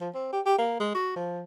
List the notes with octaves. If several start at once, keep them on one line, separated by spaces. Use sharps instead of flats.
F3
C4
G4
G4
A#3
G#3
F#4
F3